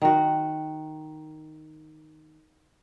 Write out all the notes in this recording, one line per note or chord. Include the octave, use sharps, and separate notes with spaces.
D#3 F#4